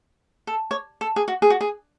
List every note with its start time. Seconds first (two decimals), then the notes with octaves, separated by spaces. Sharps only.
0.47 A4
0.71 C#5
1.01 A4
1.16 G#4
1.28 F#4
1.42 G#4
1.50 F#4
1.61 G#4